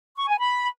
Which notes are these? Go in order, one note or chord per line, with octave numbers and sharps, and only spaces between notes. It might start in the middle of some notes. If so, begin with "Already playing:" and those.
C#6
G#5
B5